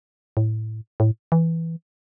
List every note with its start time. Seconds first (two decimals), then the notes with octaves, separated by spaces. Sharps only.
0.37 A2
1.00 A2
1.32 E3